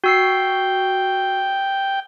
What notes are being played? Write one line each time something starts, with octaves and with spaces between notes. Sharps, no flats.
F#4 G5 E6 C7